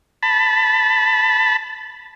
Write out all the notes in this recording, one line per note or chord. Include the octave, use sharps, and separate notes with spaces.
A5 B5